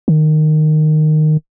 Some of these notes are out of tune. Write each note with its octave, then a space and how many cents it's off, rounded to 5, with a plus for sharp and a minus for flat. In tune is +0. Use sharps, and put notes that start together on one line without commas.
D#3 -15